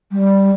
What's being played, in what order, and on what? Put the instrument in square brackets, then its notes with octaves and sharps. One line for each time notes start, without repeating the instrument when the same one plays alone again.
[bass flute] G3